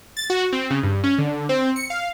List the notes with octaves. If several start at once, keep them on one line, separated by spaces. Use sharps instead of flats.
A6
F#4
C4
C#3
G2
C#4
D3
C4
C#7
F5